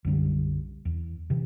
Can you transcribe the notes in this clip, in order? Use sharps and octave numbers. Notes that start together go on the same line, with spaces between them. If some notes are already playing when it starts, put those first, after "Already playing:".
B1 F#2 D3 G3
E2
C3 E3